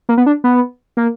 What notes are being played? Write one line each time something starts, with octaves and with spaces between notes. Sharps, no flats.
A#3
B3
D4
B3
A#3